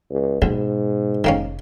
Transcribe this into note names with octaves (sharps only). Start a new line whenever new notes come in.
C#2
B1 G#2 B2
F1 D#3 A#3 C#4